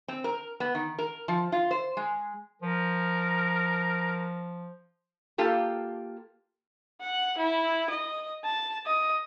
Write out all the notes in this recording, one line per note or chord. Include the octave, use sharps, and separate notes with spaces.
C4
A#4
B3
D#3
A#4
F3
F4
C5
G#3
F3 A#4
A#3 F4 G4 A4
F#5
E4
D#5
A5
D#5